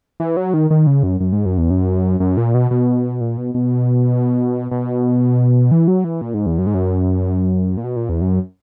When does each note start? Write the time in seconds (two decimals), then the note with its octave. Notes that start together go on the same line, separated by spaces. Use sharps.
0.20 E3
0.37 F#3
0.54 D#3
0.70 D#3
0.87 C#3
1.03 F#2
1.20 F#2
1.33 G#2
1.46 F#2
1.58 E2
1.70 F#2
2.20 F#2
2.37 A#2
2.54 B2
2.71 B2
3.21 A#2
3.37 B2
3.55 B2
4.71 B2
5.71 E3
5.88 F#3
6.04 E3
6.21 A#2
6.34 G#2
6.46 E2
6.58 F#2
6.67 G#2
6.74 F#2
7.77 A#2
7.84 B2
7.96 A#2
8.09 E2
8.21 F#2